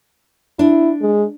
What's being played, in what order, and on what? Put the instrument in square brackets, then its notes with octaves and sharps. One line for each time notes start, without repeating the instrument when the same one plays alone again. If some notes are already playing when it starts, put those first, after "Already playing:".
[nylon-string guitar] D4 [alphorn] E4
[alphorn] G#3